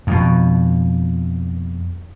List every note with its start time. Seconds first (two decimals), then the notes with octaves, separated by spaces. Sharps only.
0.07 F2 B2